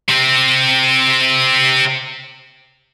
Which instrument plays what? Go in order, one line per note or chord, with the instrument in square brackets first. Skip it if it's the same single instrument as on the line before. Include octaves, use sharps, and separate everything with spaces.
[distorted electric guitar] C3 C4